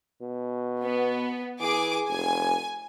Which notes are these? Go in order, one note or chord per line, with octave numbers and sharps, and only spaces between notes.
B2
B3
E3 G#4 D6
F1 G#5